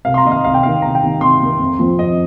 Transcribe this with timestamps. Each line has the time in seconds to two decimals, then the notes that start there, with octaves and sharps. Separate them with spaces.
0.05 C2 F5
0.14 C6
0.18 A#5
0.25 C3 D#3 D#5
0.31 F5
0.44 C2 F5
0.54 G5
0.63 C3 D#3 F5
0.82 C2 A#5
0.95 G5
1.02 C3 D#3
1.21 C2 C6
1.40 C3 D#3
1.59 F2
1.79 F3 C4
1.99 F2 D#5